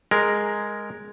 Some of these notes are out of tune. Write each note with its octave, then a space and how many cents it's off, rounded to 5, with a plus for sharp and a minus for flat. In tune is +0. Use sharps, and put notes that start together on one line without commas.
G#3 +0 A#4 +0